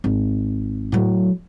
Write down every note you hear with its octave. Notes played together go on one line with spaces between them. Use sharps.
G#1
A2 F#3